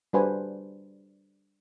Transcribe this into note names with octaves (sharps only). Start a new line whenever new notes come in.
G3 D4 F#4 B4 C5 G#5